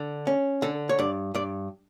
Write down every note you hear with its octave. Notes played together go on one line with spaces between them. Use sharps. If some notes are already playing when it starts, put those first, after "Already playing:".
Already playing: D3
C#4
D3 A4
C#5
G2 D5
G2 D5